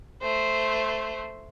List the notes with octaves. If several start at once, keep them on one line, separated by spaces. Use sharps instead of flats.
A3 C5